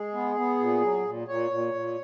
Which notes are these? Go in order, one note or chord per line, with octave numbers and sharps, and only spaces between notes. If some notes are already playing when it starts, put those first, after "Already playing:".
Already playing: G#3 G#4
B3
B3
A#2
F#3
A#2
A#2 C#5
A#2
A#2